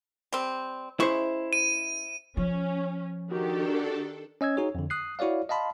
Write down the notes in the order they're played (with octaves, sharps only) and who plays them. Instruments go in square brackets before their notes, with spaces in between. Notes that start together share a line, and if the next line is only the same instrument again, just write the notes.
[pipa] G3 C4
[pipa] C#3 G#3 C#6 [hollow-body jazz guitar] E4 C5
[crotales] D#7
[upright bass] F3 [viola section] C#4
[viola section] D#3 G4 [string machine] D4 A4 [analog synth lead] F#4
[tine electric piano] C#4 D#5 E6 G#6
D#4 F#4 G#4 C#5
F2 D3
D#6 F#6 C7
E4 F#4 C#5 D5 F5
D#5 F5 A5 B5 C6